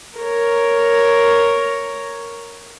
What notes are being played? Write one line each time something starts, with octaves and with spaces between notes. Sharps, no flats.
A#4 C#5